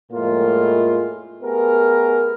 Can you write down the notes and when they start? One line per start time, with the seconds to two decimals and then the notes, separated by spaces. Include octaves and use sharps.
0.12 F2 A2 F3 G#3 A#3 F4
1.42 A3 B3 G4 G#4 A#4